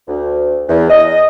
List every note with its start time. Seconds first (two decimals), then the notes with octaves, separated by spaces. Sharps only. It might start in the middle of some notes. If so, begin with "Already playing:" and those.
0.08 D2
0.68 E2
0.89 D#5